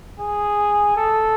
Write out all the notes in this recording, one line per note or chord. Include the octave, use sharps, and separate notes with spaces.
G#4
A4